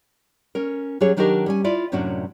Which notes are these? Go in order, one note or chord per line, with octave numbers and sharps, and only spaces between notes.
C#4 A#4
F#3 C#4 G4 G#4 C#5
D#3 F#3 D4 D#4 G4 A#4
G3 C#4 G#5
E4 F4 D5
F#2 A2 C3 C#4 D4 F#4